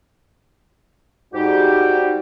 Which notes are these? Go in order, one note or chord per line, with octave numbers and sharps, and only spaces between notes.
G#2 G3 D#4 F#4 G4